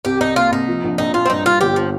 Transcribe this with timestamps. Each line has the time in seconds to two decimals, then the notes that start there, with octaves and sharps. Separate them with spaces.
0.05 C2 G4
0.20 C2 D#4
0.36 A#3 F4
0.52 C2 D#4
0.68 F3
0.84 A#1
0.98 A#1 D#4
1.14 A#2 F4
1.26 C4
1.30 G2 D#4
1.46 G2 F4
1.61 G1 G4
1.76 F3